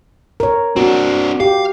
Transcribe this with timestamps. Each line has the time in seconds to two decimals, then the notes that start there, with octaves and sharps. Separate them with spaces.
0.40 A#4 C#5
0.76 C4 D4 F#4
1.40 G4 F5